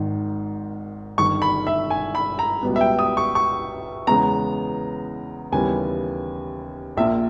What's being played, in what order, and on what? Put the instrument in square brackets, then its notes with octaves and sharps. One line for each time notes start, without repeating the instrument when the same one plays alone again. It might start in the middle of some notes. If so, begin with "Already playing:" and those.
Already playing: [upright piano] G#1 G#2 D#3
G1 G2 D#3 C#6
B5
E5
G#5
B5
A#5
C#2 B2 G3 B3
E5
G5
D#6
C#6
C#6
E2 C#3 G#3 B3 A#5
D#2 C#3 E3 G3 B3 G#5
A#1 A#2 A#3 E5